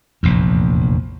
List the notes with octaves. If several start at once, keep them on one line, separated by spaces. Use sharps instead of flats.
F1 A#1 E2